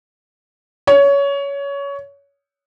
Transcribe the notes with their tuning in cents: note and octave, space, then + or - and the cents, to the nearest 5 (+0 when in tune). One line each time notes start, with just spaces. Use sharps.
C#5 +20